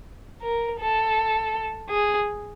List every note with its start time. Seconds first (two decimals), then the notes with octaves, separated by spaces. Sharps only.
0.43 A#4
0.79 A4
1.90 G#4